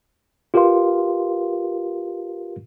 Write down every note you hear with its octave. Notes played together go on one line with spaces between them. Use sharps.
F4 G4 A#4 B4 F5 C6